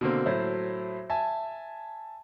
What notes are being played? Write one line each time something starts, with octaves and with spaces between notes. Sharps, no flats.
B2 D3 A#3 C4
A2 F#3 A4 C5
E5 G#5 A5